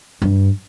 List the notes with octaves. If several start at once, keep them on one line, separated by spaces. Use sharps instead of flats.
G2